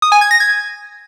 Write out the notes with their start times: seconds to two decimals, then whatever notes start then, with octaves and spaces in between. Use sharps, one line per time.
0.02 D#6
0.12 G#5
0.21 G#6
0.31 A#6
0.40 G#6